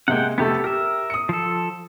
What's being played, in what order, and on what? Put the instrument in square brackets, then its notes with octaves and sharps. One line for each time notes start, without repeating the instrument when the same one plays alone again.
[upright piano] C3 G#3 A#3 [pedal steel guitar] F#5 G5
[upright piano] F2 C3 A3 [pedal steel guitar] B3 G4 A4
[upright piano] G4 [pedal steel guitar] A#4 E5
[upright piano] D#6 C#7
[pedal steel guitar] F3 A4